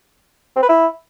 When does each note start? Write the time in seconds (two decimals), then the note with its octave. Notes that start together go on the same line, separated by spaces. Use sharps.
0.56 C4
0.63 B4
0.69 E4